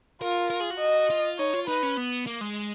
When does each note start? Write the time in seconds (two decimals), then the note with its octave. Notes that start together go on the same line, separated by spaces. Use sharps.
0.22 F4 A#4
0.50 A#4
0.60 G#4
0.71 F#4
0.80 D#5
1.10 F4
1.39 D#4 C#5
1.54 F4
1.68 D#4 B4
1.83 C#4
1.97 B3
2.27 A#3
2.41 G#3